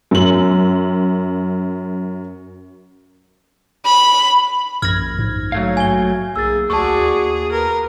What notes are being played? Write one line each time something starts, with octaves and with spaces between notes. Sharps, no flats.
F#2 F#7
B5
A#1 F#2 F6 G#6 A#6
G#2
F#3 A3 F5
G#5 G7
B1 A#3 G#4 E6 A6
D2 F#4 G#4 D5 A5 C#6
D#2
A#4 B4